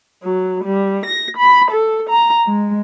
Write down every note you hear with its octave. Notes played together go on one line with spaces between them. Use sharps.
F#3
G3
A#6
B5
A4
A#5
G#3